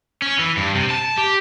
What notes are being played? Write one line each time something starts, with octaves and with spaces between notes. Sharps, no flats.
C#4
E3
G2
C3
A5
G4